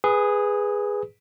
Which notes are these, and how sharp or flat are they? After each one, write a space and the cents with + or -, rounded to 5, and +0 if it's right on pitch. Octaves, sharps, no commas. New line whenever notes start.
G#4 -10 B4 +0 D#6 +30